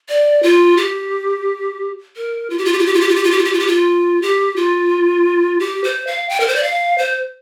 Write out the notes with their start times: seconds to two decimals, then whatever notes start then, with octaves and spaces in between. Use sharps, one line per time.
0.09 D5
0.43 F4
0.77 G4
2.16 A#4
2.50 F4
2.58 G4
2.65 F4
2.73 G4
2.79 F4
2.86 G4
2.94 F4
3.01 G4
3.09 F4
3.16 G4
3.24 F4
3.31 G4
3.38 F4
3.45 G4
3.53 F4
3.60 G4
3.67 F4
4.22 G4
4.56 F4
5.60 G4
5.84 C5
6.07 F5
6.29 G5
6.40 A#4
6.47 C5
6.55 D5
6.63 F5
6.98 C5